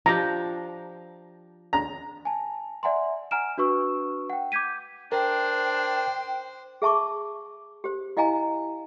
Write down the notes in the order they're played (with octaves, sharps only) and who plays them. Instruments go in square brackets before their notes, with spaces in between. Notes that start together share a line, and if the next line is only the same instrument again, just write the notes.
[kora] F3 D4 G4 [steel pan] A#5
[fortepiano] A#5
[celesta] G#5 A5
D5 E5 F#5 G#5 A#5 C6
F#5 G#5 A#5 F6 D7 E7
D4 F#4 B4 C#6 E6
F#5 G5
D6 G6 G#6 B6 D#7
[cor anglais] D4 [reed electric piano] A#4 [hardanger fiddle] C5 [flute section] G5
[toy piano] G#4 E5 A5 C#6 D6
G4 C5
E4 D#5 F5 G#5 A#5